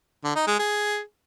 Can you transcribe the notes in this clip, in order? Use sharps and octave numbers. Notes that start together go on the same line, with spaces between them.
D3
D#4
G#3
G#4